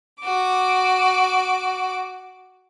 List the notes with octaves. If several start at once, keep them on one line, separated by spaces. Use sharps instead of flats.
F#4 D6